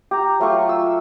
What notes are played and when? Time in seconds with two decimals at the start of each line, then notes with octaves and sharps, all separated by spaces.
0.11 G4 A#5
0.40 F#3 A3 F4 C#6
0.69 E6